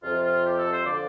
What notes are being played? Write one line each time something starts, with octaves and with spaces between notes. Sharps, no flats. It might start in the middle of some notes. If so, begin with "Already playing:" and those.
F2 C3 F3 F4
F4
G4
A4
C5
D3 F3 D5